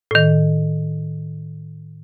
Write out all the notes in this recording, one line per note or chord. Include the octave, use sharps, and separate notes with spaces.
A2 D#3